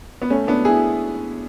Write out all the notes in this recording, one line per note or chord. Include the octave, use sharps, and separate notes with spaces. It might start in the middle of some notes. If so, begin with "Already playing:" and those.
B3
A3 C#4
B3 D4
E4 G#4